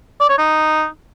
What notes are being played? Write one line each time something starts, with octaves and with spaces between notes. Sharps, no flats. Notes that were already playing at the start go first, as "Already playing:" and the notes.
D5
C#5
D#4